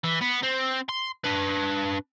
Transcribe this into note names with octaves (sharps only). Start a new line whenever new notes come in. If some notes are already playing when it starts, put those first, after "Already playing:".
E3
B3
C4
C6
D4 B4